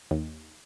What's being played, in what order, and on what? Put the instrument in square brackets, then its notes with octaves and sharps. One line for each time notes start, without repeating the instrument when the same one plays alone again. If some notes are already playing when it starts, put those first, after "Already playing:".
[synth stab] D#2